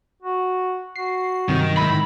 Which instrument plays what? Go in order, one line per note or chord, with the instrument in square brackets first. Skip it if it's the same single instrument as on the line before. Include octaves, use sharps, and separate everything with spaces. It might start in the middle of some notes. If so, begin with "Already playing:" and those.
[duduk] F#4
[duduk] F#4 [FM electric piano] C7
[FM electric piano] G2 C3 F#3 [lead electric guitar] D#3
[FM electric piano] G#2 A#6 [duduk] E4 [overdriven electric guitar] B5